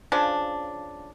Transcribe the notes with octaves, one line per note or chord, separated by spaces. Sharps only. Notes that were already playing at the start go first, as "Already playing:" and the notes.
C#3 F3 D4